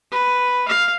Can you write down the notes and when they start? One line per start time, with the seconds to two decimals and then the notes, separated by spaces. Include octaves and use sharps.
0.11 B4
0.68 F5